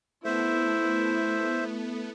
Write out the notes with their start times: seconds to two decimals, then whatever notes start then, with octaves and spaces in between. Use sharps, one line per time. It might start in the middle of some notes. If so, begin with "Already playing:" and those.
0.25 A3 B3 E4 C5 E5